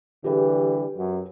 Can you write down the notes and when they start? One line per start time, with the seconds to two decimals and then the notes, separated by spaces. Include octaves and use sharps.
0.24 D3 E3 G3 G4 G#4 B4
0.97 F#2